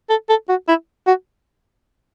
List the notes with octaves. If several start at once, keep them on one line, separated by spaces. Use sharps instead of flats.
A4
A4
F#4
E4
F#4